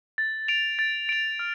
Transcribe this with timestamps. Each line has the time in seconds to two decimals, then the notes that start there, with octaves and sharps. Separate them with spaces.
0.18 A6
0.48 D7 F7
0.79 A6
1.09 D7 F7
1.39 F6